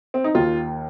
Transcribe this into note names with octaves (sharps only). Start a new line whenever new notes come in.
C4
D#4
D#2 D#3 F4